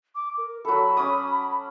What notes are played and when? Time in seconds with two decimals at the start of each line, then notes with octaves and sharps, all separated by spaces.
0.15 D6
0.38 A#4
0.65 F#3 A4 B5
0.97 C#4 D6 D#6